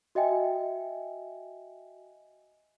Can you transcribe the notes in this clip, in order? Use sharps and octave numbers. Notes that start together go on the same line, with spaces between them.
F#4 D#5 E5 G5 G#5